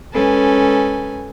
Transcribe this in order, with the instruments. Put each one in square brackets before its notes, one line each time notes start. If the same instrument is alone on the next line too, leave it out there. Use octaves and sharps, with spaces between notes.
[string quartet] G#3 C#4 A4 B4 G#5